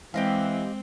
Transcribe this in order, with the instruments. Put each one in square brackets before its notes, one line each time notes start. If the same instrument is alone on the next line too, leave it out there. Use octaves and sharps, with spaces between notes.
[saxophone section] E3 [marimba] G#3 [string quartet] C4 [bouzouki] G4 D#5 F5